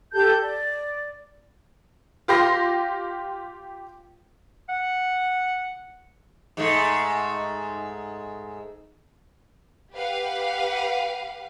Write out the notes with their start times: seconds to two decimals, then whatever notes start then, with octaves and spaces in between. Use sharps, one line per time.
0.13 G4 A4 A5 G6
0.41 D5
2.28 F4 G4 C6 A#6
4.69 F#5
6.57 G#2 G#3 A3
9.93 G4 B4 F5 F#5